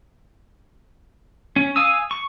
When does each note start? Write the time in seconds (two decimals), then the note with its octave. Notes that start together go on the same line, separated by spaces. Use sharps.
1.56 C#4
1.76 F5 G#5 D#6 E6
2.11 C#6